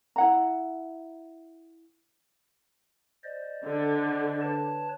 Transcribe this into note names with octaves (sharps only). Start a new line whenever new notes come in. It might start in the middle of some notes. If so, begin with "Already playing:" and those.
E4 F#5 A#5
C5 D5 D#5
D3
B4 C#5 A5